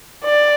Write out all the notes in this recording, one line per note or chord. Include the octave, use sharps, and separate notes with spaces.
D5